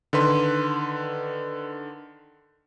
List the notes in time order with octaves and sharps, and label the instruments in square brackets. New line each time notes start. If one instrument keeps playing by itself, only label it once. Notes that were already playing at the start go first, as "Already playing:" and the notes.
[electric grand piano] D3 D#3 B4 C6